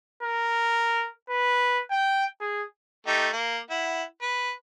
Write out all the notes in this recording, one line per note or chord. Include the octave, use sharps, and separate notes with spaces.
A#4
B4
G5
G#4
A3 D#4 G4
A#3
E4 F#5
B4